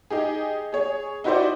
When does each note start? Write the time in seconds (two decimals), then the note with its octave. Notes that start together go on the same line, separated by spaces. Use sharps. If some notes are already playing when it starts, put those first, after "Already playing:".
0.10 D#4 G4 G#4
0.73 G#4 C#5
1.24 D#4 E4 F#4 G4 C5 D5